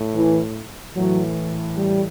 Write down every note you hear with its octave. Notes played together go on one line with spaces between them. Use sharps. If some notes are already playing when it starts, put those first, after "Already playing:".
Already playing: A2
E3
A2 E3 F#3
G3